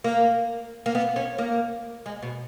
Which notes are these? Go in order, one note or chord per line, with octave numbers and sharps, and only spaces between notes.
A#3
A#3
B3
C#4
A#3
G#3
B2